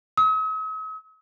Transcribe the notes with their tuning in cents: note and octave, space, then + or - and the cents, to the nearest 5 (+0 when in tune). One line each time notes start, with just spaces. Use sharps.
D#6 +45